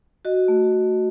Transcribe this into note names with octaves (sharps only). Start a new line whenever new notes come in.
F#4 D#5
A3
A3